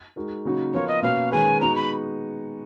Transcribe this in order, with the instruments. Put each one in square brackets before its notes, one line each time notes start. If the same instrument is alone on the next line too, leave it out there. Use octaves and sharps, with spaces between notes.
[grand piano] G#3 D#4 F#4 A#4
C#3 F#3 A#3 D#4 F#4
[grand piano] F3 B3 F4 A#4 [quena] C#5
[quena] D#5
[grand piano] B2 A#3 C#4 F#4 B4 [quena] F5
[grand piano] D#3 G#3 C#4 G#4 B4 [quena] G#5
[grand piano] G#3 B3 D#4 F#4 [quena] A#5
[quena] B5